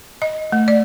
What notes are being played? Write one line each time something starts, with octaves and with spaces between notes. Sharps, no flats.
D#5
A3
D5